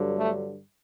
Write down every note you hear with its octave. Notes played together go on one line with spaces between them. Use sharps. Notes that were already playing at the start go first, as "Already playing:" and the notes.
Already playing: G2 D3 F#3
A3